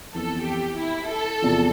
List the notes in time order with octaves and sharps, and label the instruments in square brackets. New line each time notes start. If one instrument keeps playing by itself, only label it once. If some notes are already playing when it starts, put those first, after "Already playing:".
[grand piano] F2 E3 B3 [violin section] A4
[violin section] G4
E4
A4
[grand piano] E2 C3 F3